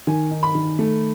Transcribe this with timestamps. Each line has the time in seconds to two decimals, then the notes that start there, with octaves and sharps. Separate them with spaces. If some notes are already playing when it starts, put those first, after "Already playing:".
0.07 D#3 G#5
0.31 D#4
0.43 B5
0.55 D#3
0.79 A3